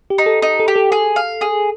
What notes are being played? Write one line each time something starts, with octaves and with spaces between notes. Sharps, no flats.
G4
D#4
A4
D#4
A4
G4
A4
G#4 A4
F5
G#4